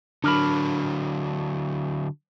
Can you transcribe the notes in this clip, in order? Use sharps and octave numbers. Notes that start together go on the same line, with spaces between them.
D3 F#3 D4 A#4 B5